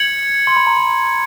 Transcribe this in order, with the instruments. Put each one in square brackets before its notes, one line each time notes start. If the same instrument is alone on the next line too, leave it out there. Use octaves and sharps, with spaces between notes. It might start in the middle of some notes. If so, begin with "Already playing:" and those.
Already playing: [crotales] G#6 C#7 F#7
[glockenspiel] C6
B5
A#5
B5